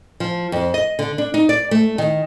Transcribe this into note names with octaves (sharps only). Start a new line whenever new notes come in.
F3
F2
D#5
D3
D4
D#4
D5
A3
D#3